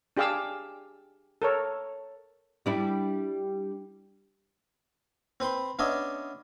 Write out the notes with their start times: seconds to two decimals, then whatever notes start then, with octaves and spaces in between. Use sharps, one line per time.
0.17 D4 G4 G#4 F5 D6 E6
1.42 A4 A#4 C#5
2.66 G3 D4 E4
5.40 C4 B4 B5 C6
5.79 B3 C#4 D4 D#5 E5